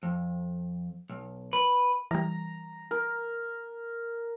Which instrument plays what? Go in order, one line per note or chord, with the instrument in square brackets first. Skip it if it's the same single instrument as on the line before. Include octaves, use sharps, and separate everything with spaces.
[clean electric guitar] F2
B1
B4
[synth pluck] E3 G3 [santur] A#5
[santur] A#4